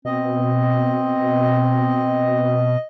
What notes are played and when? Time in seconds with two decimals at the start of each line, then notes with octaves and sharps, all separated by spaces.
0.05 B2 C4 D#5